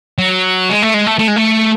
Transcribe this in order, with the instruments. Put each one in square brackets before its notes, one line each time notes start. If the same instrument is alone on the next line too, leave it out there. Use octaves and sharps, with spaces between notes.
[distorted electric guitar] F#3
G#3
A3
G#3
A3
A3
G#3
A3